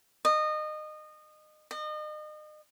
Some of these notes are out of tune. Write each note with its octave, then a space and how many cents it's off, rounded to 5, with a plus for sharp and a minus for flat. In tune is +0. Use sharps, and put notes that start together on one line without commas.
D#5 -25
D#5 -35